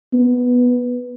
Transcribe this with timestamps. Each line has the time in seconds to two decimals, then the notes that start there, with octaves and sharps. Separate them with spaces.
0.13 B3